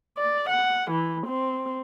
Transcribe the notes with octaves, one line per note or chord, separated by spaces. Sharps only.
D5
F#5
E3
C4